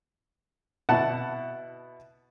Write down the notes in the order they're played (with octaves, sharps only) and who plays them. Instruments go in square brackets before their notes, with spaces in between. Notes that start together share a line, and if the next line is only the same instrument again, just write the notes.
[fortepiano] B2 E4 F#5 A5